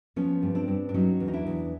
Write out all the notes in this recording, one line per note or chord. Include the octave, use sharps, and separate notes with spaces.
F3 B3 C#4
G2
C4 D4
G2
D4
F#3 C#4 D#4
E2
D#4
D4 E4
E2